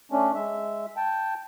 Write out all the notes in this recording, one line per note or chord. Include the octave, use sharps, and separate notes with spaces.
A3 C#4 D4
G#3 E5
G5 A5